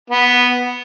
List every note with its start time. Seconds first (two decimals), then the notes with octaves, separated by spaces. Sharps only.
0.10 B3